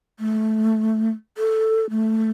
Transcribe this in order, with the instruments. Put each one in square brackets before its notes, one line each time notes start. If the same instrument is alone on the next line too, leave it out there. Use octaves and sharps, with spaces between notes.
[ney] A3
A4
A3